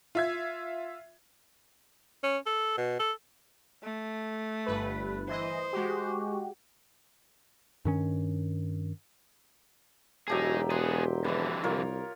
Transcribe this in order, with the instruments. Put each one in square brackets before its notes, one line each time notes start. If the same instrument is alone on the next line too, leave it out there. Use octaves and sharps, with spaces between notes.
[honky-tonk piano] F4 E5 G#6
[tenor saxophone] C#4
A4
B2
A4
[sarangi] A3
[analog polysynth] G1 G2 B4
[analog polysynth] E3 D#5 [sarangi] C5
[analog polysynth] G#3 F#4 G4
[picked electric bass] G2 D#3 C#4
[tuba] E1 [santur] F#3 G4 A5 [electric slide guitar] D#4 G#4
[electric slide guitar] B3 G#4 [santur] C6
[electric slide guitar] F2 D3 E3 [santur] B4 D#5
[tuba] C2 [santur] F4 A#4 C#5